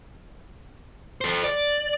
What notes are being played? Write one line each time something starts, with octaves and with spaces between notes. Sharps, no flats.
A4 C5
D5